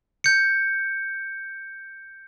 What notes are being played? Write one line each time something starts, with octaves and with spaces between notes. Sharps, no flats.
G6 C#7